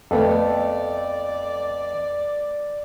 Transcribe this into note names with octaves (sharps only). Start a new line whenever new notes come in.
F2 A3 B3 A4 D5